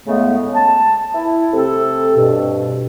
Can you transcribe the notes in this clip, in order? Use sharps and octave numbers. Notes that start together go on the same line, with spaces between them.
A2 C#3 G#3 A3 B3
A5
E4
C3 A3 C4 A4
G2 B2